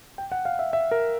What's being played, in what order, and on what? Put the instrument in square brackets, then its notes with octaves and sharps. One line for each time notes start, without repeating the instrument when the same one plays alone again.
[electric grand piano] G5
F#5
F5
E5
E5
A#4